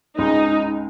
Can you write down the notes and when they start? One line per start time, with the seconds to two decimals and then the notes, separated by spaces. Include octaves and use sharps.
0.18 C#2 C#3 G#3 D#4